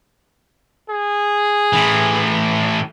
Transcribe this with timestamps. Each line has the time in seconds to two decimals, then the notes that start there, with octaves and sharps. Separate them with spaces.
0.89 G#4
1.73 A2 E3